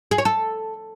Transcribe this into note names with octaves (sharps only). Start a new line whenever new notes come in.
G#4
C#5
A4